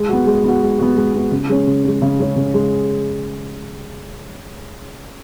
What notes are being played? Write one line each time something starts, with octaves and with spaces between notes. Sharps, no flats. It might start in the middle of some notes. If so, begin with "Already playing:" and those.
Already playing: G#3
B3 F#4
G#3
B3 F#4
G#3
B3 F#4
G#3
B3 F#4
C#3
G#3 C#4
C#3
G#3 C#4
C#3
G#3 C#4
C#3
G#3